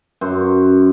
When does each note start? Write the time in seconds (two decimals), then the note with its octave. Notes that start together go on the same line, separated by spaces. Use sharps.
0.21 F#2 C5